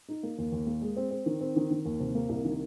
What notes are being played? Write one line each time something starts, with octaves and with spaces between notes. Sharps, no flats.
D#4
A#3
D#2
D#2
A#3
G#3
C4
C4
D#3
C4
D#3
D#3
D#2
C3
A#3
C2
D#3